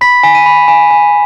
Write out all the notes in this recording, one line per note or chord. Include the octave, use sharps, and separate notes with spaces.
B5 B6
G#5 B6
D#7
B5
G#5
G#5